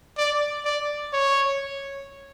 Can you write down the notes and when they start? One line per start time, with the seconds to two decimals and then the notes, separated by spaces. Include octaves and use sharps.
0.18 D5
0.65 D5
1.13 C#5